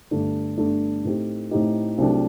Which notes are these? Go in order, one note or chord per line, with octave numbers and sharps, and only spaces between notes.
G1 G2 D3 A3 D4
G1 G2 D3 A3 D4
A2 A3 C4 D#4 G4
A2 A3 C4 D#4 G4
C2 C3 F#3 A3 D4